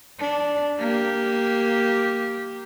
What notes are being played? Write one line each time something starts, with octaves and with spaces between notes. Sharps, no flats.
D4
A#3 G4